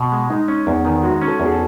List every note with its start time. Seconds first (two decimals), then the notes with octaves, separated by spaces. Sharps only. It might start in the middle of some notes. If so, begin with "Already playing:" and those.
Already playing: B2
0.12 G#3
0.30 G#3 D#4
0.48 C#4
0.67 E2
0.85 D#3
1.03 G#3 F#4
1.21 C#4
1.28 A4
1.40 E2
1.46 G#4
1.52 A4